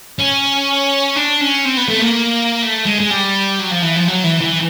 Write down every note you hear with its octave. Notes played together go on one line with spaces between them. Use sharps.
C#4
D4
C#4
C4
B3
A3
A#3
A3
G#3
G#3
G3
F#3
F3
E3
F3
F#3
E3
E3